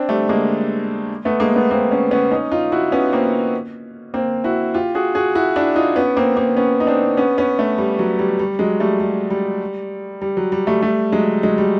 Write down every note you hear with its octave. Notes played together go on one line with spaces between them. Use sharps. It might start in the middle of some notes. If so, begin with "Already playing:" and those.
Already playing: C4 D4
G3 A3
G#3 A#3
A3 B3
G#3 A#3
A3 B3
A#3 C4
B3 C#4
B3 C#4
C#4 D#4
D#4 F4
E4 F#4
B3 C#4
A#3 C4
A#3 C4
E4 F#4
F4 G4
F#4 G#4
F#4 G#4
E4 F#4
D4 E4
D#4 F4
B3 C#4
A#3 C4
A#3 C4
B3 C#4
D#4
C4 D4
B3 C#4
B3 C#4
A3 B3
G3
F#3
G3
G3
F#3 G#3
G3 A3
G3
G3
G3
F#3
G3
G3 A3
G3 A3
F#3 G#3
F#3 G#3
G3